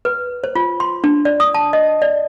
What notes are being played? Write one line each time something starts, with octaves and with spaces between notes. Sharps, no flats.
B4
C5
F4
C6
D4
D5
D#6
A5
D#5
D5